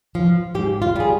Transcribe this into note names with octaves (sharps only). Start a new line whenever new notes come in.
F3
G#2 G4
F4
G3 G#4